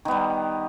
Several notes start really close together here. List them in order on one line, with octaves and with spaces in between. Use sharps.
D#3 B3 G3